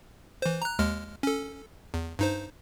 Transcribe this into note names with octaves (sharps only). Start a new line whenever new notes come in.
E3 C5
A#5 F#6
D#2 G#3 F6
C#4 A4
E2
G2 D#4 C5